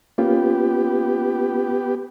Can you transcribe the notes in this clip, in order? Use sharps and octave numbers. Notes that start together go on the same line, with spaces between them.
A#3 B3 C#4 F4 G4